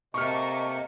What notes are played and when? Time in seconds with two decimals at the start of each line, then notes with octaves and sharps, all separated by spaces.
0.14 C3 A3 A#3 D#5 C#6 F6 C#7